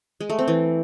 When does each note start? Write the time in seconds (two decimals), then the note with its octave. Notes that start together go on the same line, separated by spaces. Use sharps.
0.20 G#3
0.30 A3
0.39 C4
0.48 E3